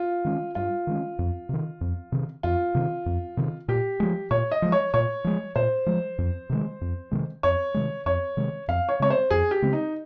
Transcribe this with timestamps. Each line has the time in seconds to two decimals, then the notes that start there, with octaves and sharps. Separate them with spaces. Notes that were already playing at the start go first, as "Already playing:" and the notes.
Already playing: F4
0.25 D#3 G#3 C#4
0.55 G2 F4
0.87 D#3 G#3 C#4
1.19 F2
1.49 C3 D#3
1.81 F2
2.12 C3 D#3
2.43 F2 F4
2.75 C3 D#3
3.06 F2
3.37 C3 D#3
3.68 A#2 G4
4.00 F3 G#3
4.31 A#2 C#5
4.52 D#5
4.62 F3 G#3
4.72 C#5
4.94 A#2 C#5
5.24 F3 G#3
5.55 A#2 C5
5.86 F3 G#3
6.18 F2
6.50 C3 D#3 G#3
6.81 F2
7.11 C3 D#3 G#3
7.43 F2 C#5
7.74 C3 D#3 G#3
8.06 F2 C#5
8.37 C3 D#3 G#3
8.68 F2 F5
8.89 C#5
9.00 C#3 G#3 C4 C#5
9.10 C5
9.30 F2 G#4
9.51 G4
9.62 C#3 G#3 C4
9.73 D#4